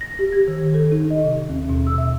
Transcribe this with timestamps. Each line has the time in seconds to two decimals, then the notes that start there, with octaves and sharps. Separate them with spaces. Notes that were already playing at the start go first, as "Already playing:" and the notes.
0.01 A#6
0.19 G4
0.33 G#6
0.48 D#3
0.74 A4
0.92 D#4
1.10 D#5
1.24 C3
1.49 D#2
1.70 B2
1.87 E6
1.98 E5